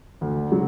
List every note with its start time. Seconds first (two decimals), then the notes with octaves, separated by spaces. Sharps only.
0.21 D2
0.51 C#3 F#3